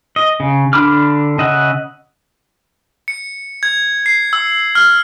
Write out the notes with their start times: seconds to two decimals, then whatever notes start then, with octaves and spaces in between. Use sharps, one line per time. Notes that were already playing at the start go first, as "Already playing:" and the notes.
0.16 D#5
0.40 C#3
0.73 D3 D4 B5 D6 F6
1.38 C#3 D#5 E5 F#5
3.08 C#7
3.63 G#6
4.06 C7
4.33 E6
4.75 F6